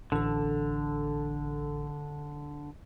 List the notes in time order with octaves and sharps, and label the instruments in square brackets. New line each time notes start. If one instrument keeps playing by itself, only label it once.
[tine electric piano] A1 A4 [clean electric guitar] D3